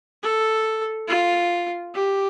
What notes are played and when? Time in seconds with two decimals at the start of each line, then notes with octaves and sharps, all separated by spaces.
0.23 A4
1.08 F4
1.95 G4